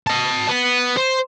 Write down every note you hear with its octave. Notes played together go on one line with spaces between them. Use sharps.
D#5 A5
B3
C5